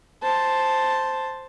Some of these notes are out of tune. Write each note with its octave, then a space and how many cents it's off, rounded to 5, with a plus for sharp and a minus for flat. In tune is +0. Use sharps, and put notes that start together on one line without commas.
C5 +0 A5 +0